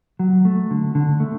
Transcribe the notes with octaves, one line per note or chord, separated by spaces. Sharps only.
F#3
A3
D3
D3
A3